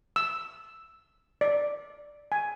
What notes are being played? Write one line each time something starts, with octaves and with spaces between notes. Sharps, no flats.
E6
D5
G#5